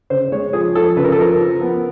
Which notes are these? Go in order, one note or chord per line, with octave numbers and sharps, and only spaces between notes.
C#3 C5
G#3 C#5
F3 G#4
F3 A4
C#3 B4
A#4
A4
F3 A#4
F3
B3